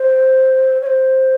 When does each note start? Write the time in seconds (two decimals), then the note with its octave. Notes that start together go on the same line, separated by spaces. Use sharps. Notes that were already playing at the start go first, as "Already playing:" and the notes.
Already playing: C5
0.82 C#5
0.86 C5